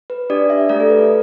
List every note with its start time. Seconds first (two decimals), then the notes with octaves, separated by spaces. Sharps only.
0.10 B4
0.30 D4 G4 D5
0.50 E5
0.69 A3 G4 D5
0.80 A4
0.90 B4